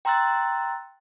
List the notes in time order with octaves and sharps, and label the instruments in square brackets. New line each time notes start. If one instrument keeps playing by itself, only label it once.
[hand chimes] G5 A#5 C6 E6 F#6 A6